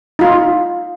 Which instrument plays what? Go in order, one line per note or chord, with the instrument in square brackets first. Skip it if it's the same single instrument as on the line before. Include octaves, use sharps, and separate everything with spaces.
[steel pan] D#4 F4